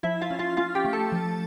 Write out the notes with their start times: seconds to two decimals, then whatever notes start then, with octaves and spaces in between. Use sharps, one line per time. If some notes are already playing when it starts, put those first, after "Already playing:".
0.03 F3 E4 E5
0.21 F4 F5
0.30 C#4
0.39 F4 F5
0.57 C#4 F4 F5
0.75 G4 G5
0.85 A3
0.93 A4 A5
1.12 F3